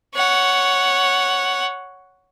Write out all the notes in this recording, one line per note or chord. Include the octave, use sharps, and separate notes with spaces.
C#5 F#5